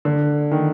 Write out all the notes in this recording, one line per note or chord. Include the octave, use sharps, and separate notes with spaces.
D3
D#3